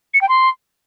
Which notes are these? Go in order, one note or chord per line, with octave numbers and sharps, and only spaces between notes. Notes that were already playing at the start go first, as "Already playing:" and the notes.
C#7
G5
C6